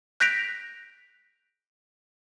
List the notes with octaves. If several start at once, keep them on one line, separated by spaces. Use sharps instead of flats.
F#6 G6 A#6 B6 D7 F7